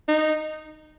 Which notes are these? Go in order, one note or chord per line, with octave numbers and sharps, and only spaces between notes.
D#4